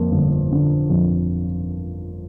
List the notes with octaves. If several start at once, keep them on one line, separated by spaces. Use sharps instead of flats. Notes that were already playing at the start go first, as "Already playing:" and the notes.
Already playing: F2 A#3
G1
D3
F2